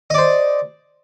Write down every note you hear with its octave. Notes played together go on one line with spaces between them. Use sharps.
C5 D5 D#5